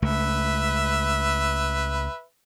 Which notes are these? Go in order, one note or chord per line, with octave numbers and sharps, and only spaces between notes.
C#2 A3 B4 E5